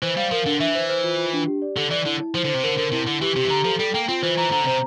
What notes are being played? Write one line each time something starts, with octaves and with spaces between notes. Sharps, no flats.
E3 C5
G3 F5
F3 A#4
D3 D4
E3 E5
C5
C5
F4
F4
D4
G4
D5
D3 A4
E3 D5
D3 E4
E4
F3 C5
D3 C5
C3
D3 A#4
D3 A#4
C3 E4
D3 E4
E3 G4
C3 G4
E3
D3 A#5
F3 A4
G3 A4
A#3 G5
C4 F4
E3 C5
E3 A#5
D3 A#5
C3 C5